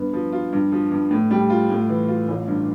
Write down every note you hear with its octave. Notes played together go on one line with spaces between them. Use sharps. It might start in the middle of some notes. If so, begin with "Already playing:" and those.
Already playing: G2 B3
F3
F4
G2
F3
G2
A2
G3
F4
A2
E3
F4
A1
G2